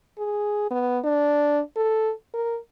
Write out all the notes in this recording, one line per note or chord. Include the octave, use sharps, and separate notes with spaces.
G#4
B3
D4
A4
A#4